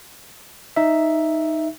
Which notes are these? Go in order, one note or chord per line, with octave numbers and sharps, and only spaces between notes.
D#4 E5